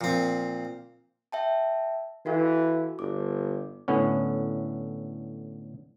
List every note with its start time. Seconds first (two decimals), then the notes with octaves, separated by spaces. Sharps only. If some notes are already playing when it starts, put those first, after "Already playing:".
0.01 A#2 F3 A#3 C4
1.32 E5 G5 A5
2.26 E3 F#4 A4 F5
2.99 G1 D6
3.88 A2 D3 B3 C#4